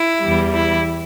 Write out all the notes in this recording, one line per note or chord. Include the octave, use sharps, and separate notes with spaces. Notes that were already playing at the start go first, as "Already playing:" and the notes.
Already playing: E4
E2 E3 G3
E4